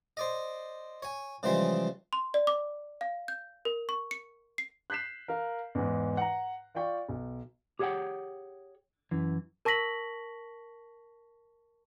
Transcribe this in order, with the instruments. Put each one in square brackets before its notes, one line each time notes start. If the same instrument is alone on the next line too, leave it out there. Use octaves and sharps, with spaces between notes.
[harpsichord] C5 D5 D#5
C#5 G#5
C#3 E3 F3 G3 G#3 C5
[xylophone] C6
D5
D6
F5
G6
A#4
C#6
C#7
C7
[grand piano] F#6 G6 B6 C7 E7
A#4 F5
E2 G#2
F#5 A#5
F4 D5 F5 G5 C#6
B1
[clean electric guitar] G4 G#4 C#5 E5 F#5 G5
F#2 E3
[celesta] A#4 A5 C#6 A#6 B6 F#7